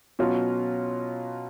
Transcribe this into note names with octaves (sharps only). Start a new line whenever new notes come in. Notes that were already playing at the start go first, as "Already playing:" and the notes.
B2 F#3 C#4 F4